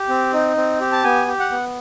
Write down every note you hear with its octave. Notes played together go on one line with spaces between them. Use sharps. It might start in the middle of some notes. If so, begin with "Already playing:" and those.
Already playing: G4
C4
D#4
C4
G4
A5
B3 G#5
G4
F#5
B3